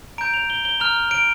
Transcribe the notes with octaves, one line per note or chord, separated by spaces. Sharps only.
A#5 G6 D7
F7
G7
G7
A#5 F6 F7
D7